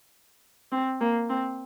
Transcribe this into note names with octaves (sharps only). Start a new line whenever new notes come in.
C4
A#3
C4